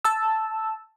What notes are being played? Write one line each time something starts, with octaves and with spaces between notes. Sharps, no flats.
A5 E6